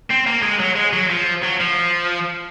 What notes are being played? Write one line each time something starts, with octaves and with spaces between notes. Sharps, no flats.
C4
A#3
G#3
F#3
G#3
F#3
F3
F#3
F3